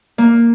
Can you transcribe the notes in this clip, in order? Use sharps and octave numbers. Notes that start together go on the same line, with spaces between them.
A#3